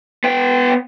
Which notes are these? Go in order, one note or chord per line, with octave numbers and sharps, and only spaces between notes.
B3 G5